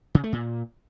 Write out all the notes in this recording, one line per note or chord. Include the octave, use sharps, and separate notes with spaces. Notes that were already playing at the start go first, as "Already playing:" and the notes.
C#3
A3
A#2